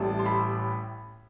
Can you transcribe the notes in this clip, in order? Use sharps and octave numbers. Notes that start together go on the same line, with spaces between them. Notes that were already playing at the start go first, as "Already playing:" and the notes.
Already playing: A1 A2 G3 A5
C6
B5